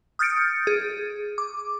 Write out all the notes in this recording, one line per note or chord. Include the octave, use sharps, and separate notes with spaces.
D#6 F6 G6 A6 C#7 D7
G#4
D6